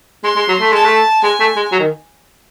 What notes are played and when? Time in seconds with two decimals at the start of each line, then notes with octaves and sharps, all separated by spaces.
0.24 G#3 C6
0.36 G#3
0.48 F#3
0.61 A3
0.72 G#3 A5
0.85 A3
1.23 G#3 G#5
1.40 A3
1.56 G#3
1.72 F#3
1.80 D#3